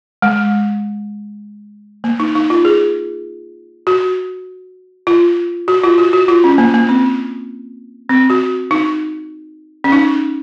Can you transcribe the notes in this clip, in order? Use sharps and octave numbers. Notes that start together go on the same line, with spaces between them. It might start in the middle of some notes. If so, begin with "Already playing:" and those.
G#3
A#3
D#4
D#4
F4
G#4
F#4
F4
F#4
F4
F#4
F#4
F4
C#4
A#3
A#3
C4
C4
F#4
D#4
C#4
D#4